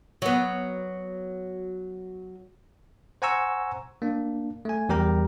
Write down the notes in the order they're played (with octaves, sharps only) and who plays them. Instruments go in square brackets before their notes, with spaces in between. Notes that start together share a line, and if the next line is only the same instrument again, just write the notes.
[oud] F#3 B3
[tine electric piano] C5 F#5 G#5 A#5 C#6 E6
A#3 D4
A3 G#5
E2 G3 G4 A#4 G5 A#5